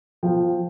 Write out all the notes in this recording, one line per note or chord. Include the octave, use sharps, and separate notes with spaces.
F3 G5